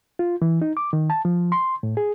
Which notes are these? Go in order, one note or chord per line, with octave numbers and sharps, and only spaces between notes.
F4
E3
D#4
D6
D#3
A5
F3
C6
A2
G#4